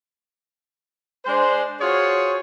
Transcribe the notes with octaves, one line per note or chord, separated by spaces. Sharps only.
G#3 D4 C5
F4 F#4 G#4 C5 C#5